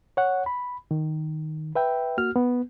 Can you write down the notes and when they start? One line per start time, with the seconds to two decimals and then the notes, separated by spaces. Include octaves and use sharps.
0.17 C#5 F#5
0.46 B5
0.91 D#3
1.75 B4 E5 G5
2.17 A#3 F#4 F6
2.36 B3